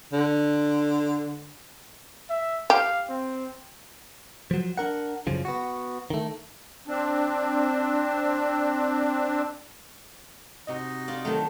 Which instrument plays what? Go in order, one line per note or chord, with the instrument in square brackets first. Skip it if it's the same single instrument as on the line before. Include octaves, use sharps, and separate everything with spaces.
[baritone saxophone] D3
[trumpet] E5
[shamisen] G4 [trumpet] F5
[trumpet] C4
[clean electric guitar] F3 F#3
D4 A#4 F#5
F#2 C#3 F3
B3 F#4
D#3 A3
[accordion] C4 D4
[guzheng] C3 [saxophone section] D#4 F#4 D#5
[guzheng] F4 D5
D#3 F#3 A3